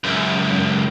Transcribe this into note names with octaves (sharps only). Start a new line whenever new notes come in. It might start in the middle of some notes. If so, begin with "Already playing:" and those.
C#2 F#2